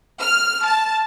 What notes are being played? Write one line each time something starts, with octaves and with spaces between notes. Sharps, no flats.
F6
A5